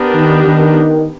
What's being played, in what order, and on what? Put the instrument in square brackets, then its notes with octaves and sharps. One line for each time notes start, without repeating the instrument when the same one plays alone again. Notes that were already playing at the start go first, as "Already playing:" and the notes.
Already playing: [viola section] B3 D4 G4 A#4
[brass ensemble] D#3
D#3